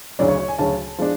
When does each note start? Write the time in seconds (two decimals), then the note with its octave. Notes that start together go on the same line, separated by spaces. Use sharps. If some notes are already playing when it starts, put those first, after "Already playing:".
0.19 D2 C#3 F#3 C#4 D5
0.28 C#5
0.38 C#5
0.48 G#5
0.59 D2 C#3 F#3 C#4 A5
0.98 F3 G#3 D4